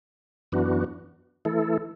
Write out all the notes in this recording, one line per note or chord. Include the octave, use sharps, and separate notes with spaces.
F#2 E3 B3 D4 F#4
E3 A3 E4 A4